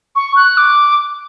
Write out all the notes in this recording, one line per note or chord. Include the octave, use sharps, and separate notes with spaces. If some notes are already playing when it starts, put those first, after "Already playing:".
C#6
F#6
D6